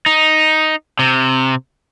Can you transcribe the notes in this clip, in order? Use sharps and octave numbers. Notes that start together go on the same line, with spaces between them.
D#4
C3